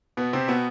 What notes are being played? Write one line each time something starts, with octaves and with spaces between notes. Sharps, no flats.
B2 B3
C3 C4
B2 B3